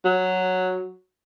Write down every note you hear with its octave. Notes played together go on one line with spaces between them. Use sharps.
F#3